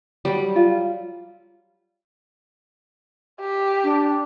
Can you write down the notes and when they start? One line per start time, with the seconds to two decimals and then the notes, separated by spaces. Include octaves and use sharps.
0.25 F#3 G3
0.56 F4
3.41 G4
3.84 D4